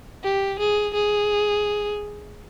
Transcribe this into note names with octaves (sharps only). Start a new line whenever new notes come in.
G4
G#4
G#4